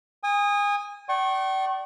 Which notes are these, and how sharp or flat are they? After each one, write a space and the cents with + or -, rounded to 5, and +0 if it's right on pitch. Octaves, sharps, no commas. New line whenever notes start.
G#5 -30 D#6 +0
D5 +0 G5 -45 C#6 -30